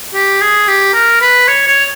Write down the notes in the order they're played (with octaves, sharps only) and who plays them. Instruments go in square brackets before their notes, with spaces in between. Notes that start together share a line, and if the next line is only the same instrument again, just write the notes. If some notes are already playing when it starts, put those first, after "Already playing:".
[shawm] G4
G#4
G4
A#4
B4
C#5
C#5